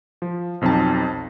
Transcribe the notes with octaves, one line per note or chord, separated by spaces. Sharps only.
F3
B1 F2 C4 D#4 A5